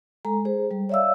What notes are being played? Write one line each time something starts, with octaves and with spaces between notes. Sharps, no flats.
G#3 A4 A#5
G#4 C5
G3
C#5 D5 E5 F5 E6